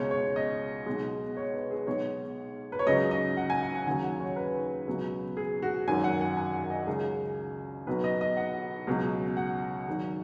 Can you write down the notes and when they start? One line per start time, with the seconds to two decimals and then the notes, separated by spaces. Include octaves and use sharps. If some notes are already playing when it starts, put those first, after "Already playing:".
Already playing: C#2 B2 G#3 C#5
0.11 C#5
0.36 D#5
0.86 B1 B2 G#3
1.37 C#5
1.54 B4
1.71 G#4
1.87 B1 B2 G#3 C#5
2.72 B4
2.79 C#5
2.87 C#2 C#3 F#3 D#5
3.11 D#5
3.37 F#5
3.50 G#5
3.62 F#5
3.75 F#5
3.86 D#2 C#3 F#3 G#5
4.04 F#5
4.20 C#5
4.36 B4
4.87 C#2 B2 F#3
5.37 G#4
5.62 F#4
5.88 G#1 F#2 D#3 F#3 G#5
6.04 F#5
6.21 F#5
6.37 G#5
6.53 F#5
6.70 D#5
6.87 C#2 C#3 F#3 G#4
7.87 B1 B2 F#3 B4
8.04 D#5
8.21 D#5
8.37 F#5
8.87 C#2 B2 F#3
9.37 F#5
9.88 G#1 G#2 F#3